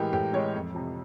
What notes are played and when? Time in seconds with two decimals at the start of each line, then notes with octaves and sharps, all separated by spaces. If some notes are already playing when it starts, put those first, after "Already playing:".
Already playing: A2 E3 G#3 G4 A#4
0.13 A2 G4
0.33 E3 G#3 C#5
0.54 F2
0.75 C3 F3